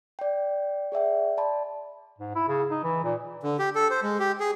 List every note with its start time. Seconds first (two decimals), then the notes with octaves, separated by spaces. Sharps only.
0.19 D5 G5
0.92 G#4 D5 E5 G5
1.37 D5 A5 B5 C6
2.19 G#2
2.35 E4
2.48 C#3
2.71 D#4
2.84 E3
3.04 A#2
3.43 D3
3.59 G4
3.75 A4
3.90 C5
4.02 G#3
4.19 G4
4.40 G#4